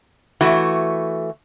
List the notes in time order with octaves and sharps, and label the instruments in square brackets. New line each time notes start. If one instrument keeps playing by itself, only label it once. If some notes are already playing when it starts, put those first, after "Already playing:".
[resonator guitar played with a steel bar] E3 A3 F#4